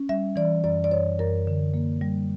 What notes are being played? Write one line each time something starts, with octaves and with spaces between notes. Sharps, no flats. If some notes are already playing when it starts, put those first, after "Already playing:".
Already playing: C#4
G3 E5
E3 D5
F#2 D5
D5
F#2 C#5
F#2 A#4
D3
A#3
G3